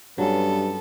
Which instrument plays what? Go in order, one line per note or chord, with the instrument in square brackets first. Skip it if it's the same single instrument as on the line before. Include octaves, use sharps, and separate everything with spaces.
[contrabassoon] G2 [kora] F#3 C#4 [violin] B3 A4